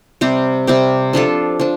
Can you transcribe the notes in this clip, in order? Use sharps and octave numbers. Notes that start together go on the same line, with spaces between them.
C3 G3 C4 G4
C3 G3 C4 G4
F3 D4 F4 A4
F3 D4